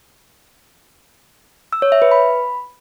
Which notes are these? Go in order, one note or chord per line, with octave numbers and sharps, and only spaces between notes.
E6
C#5
E5
B4
B5